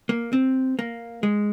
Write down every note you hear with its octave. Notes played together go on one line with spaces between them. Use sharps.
A#3
C4
A#3
G#3